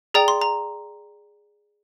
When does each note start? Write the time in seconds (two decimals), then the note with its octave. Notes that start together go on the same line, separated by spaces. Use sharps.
0.14 G#4 D5 G5 A#5
0.28 C6
0.42 A#5